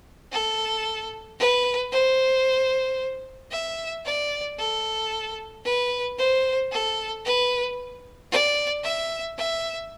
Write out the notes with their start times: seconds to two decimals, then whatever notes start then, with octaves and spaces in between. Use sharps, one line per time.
0.32 A4
1.39 B4
1.92 C5
3.52 E5
4.06 D5
4.59 A4
5.65 B4
6.18 C5
6.72 A4
7.25 B4
8.31 D5
8.84 E5
9.38 E5